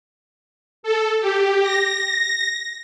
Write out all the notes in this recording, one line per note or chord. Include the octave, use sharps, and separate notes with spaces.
A4
G4
A#6